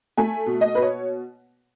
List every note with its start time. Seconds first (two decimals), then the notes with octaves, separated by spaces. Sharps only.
0.17 A3 G#5
0.46 B2
0.61 D#5
0.75 B2 B4
0.82 C#5